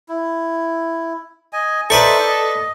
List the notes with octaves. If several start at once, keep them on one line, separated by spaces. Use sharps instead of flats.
E4
D#5 G#5
D#4 A4 B4 C5 D5 E5 C#6
D#5